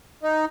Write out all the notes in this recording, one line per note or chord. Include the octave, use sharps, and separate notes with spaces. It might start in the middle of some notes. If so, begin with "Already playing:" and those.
D#4